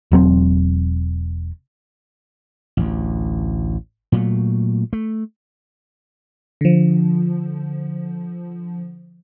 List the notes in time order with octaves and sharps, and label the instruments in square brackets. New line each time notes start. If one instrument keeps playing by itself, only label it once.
[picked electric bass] E1 F#3 C4
[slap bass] A1 D2
A#2 F#3 A3
A3
[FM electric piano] D3 F3